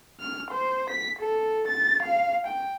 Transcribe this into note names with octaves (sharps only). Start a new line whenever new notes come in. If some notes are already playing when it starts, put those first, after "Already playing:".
F6
C5
B6
A4
A6
F5
G5